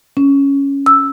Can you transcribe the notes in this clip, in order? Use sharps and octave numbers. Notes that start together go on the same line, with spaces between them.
C#4
E6